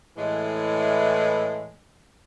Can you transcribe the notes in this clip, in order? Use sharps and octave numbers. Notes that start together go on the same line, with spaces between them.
A2 E3 G#3